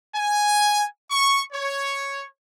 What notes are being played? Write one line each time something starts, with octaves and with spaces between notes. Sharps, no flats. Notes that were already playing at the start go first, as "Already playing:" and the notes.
G#5
C#6
C#5